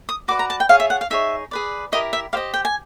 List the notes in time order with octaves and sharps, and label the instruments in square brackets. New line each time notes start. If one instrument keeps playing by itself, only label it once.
[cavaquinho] D#6
F#4 B4 D5 D6
A#5
A5
G5
F4 G#4 C#5 F5
E5
F#5
F5
D#4 G#4 C#5 E5
G#4 B4 D5
E4 G4 A#4 D#5
E5
G4 C5 D#5 F5
G5
G#5